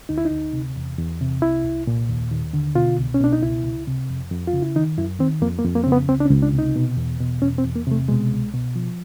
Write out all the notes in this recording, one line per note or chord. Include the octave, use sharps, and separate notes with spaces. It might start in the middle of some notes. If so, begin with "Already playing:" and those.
D2 D#4
E4
D#4
D2
C3
E2
E2
C3
C2 E4
C2
A#2
D#2
D#2
D3
B2 F4
C2
C#4
B2 D4
D#4
C#2 E4
C#2
C3
F2
F2
F4
C#3
E4
D#3 D#4
F#2 E4
D#3 C4
F2 A#3
A#3
F2
A#3
C4
C#3
B3
C#2 C4
D4
C#4
C#2
D4
C3
D#4
B2
E2
B2
E2 C#4
C4
E2
A#3
C3 A3
B2 G#3
C2
B2
F3